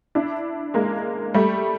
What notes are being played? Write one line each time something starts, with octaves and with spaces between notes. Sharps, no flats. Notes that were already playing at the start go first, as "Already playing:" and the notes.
D4 E4
G#3 A#3
G3 A3